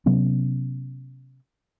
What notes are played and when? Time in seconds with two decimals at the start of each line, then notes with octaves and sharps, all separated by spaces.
0.06 C3 F#3 B3 C#4